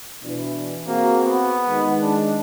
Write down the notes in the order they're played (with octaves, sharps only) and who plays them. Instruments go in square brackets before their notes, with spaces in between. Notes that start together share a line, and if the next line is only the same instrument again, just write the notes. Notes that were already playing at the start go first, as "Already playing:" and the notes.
[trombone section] B2 E3 D4
[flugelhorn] A#3 [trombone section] C4 F#4 G#4
[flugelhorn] B3
[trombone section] D#3 G#3
[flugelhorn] D4